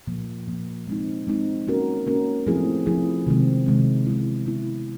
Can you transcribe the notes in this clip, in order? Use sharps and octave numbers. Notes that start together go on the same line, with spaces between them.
A#2 F3 A#3
A#2 F3 A#3
G#3 C4 D#4
G#3 C4 D#4
A#3 C#4 F#4 A#4
A#3 C#4 F#4 A#4
F3 A3 C4 E4 G#4
F3 A3 C4 E4 G#4
C3 D#3 G#3 C4
C3 D#3 G#3 C4
G#3 B3 E4
G#3 B3 E4